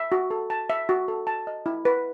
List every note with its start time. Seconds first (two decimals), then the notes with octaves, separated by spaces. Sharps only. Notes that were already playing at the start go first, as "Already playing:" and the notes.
Already playing: E5
0.12 F#4
0.30 A4
0.50 A5
0.70 E5
0.89 F#4
1.08 A4
1.27 A5
1.47 D#5
1.66 E4
1.85 B4